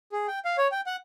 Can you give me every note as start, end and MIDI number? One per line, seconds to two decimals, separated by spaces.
0.12 0.27 68
0.28 0.39 79
0.45 0.57 77
0.58 0.67 73
0.72 0.81 79
0.86 0.96 78